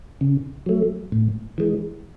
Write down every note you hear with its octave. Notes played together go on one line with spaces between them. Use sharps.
C#3
F#3 A3
A2
E3 G#3